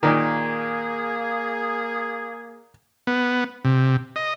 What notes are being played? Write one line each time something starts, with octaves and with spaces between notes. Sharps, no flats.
A#2 D#3 A#3 G#4
B3
C3
D#5